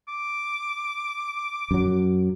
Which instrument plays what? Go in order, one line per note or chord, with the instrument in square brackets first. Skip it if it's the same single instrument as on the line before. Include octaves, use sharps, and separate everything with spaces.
[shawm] D6
[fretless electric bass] F#2 F#3